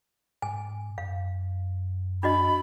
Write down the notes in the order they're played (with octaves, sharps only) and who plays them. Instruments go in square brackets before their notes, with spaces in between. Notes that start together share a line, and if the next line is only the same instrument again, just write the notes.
[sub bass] G#2 [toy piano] G#5
[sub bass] F#2 [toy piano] F5
[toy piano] D4 F#4 D#5 [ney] B5